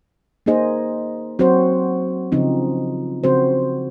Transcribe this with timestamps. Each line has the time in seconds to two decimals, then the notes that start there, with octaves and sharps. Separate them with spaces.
0.46 A#3 D#4 G#4 C5 D#5
1.39 F#3 C4 F#4 C5
2.32 C#3 F3 C4 D#4
3.24 C#3 F3 C4 F#4 C5